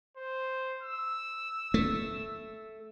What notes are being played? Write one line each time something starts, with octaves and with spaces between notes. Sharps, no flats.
C5
E6
A3